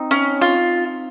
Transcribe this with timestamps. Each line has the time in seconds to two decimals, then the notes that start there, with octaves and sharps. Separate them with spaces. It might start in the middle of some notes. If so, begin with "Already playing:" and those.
Already playing: C4 D#4
0.11 C#4
0.41 F4